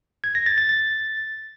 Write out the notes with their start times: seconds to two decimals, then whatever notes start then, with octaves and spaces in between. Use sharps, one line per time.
0.24 G#6
0.35 A#6
0.46 A6
0.58 A6
0.69 A6